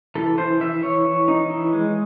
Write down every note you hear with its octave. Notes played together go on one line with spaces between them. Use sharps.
E3 A4
E3 C5
E3 E5
E3 C#5
E3
D#4
E3
G#3